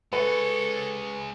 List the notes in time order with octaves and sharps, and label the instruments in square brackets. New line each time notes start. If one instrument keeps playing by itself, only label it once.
[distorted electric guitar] G#3 C#5 [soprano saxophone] A4 [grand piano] B4